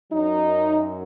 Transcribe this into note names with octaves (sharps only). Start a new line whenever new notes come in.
F#2 F#3 D#4